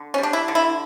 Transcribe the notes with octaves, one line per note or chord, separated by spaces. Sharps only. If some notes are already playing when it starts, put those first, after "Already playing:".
Already playing: D3
C#4
G3
D4
E4
D3
E4